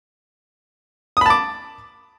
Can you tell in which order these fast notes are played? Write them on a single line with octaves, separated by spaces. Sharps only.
D#6 B5 A5 D6